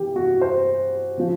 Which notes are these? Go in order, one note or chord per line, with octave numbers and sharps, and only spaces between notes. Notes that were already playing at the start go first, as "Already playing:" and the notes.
Already playing: E3 G4
F#4
C5
C#3 F3